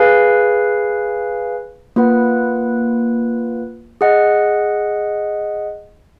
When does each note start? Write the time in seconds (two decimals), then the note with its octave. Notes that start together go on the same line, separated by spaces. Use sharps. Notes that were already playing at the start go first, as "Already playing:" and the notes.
Already playing: G#4 B4 F5 G#5
1.96 A#3 F4 B4 F#5
4.01 G#4 D#5 F#5